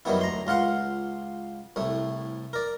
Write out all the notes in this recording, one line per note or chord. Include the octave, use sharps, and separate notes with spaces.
F#2 D#3 F#3 G3 B3 E4
D2 A#5 C6
C#2 F4 F5 F#5 C6
C2 A2 A3
A#4 D5